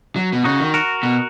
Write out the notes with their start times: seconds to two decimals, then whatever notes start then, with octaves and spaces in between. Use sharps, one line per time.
0.16 F#3
0.33 B2
0.44 C#3 D#4 F#4
0.60 D#3
0.74 F#4 A#4
1.03 B2